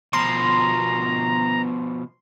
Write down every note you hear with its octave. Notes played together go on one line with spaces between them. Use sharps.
B2 F3 A#5 C6